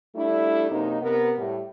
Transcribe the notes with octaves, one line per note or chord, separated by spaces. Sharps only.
G3 A3 D4 E4
F#2 C3 A#3 D#4
C3 B3 A#4
A2 G3